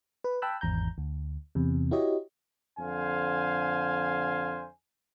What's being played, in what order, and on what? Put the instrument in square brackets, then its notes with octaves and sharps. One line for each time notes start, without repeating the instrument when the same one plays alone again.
[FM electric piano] B4
G5 A5 B5 E6 F#6
G#1 E2 A#5 G6
D2
E2 C3
E4 F#4 G4 C#5 D#5
[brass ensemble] F2 D3 C5 F5 G#5